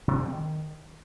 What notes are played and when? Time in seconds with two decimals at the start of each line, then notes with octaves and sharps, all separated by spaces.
0.08 C3
0.14 D3
0.20 C4
0.26 G3
0.32 D#3